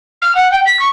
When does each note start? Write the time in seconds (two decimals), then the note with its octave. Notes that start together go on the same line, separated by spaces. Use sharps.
0.22 F6
0.35 F#5
0.52 G5
0.66 B6
0.79 C#6